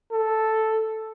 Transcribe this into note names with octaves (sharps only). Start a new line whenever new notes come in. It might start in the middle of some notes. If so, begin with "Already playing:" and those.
A4